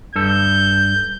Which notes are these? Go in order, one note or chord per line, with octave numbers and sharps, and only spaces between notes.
G2 A4 G6